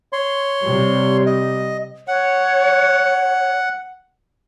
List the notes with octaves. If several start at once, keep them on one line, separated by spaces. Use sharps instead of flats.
C#5 C6
C3 G3
D#5
C#5 F#5